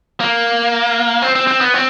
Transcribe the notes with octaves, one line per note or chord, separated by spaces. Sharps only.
A#3
C4
C4
C4
B3
C4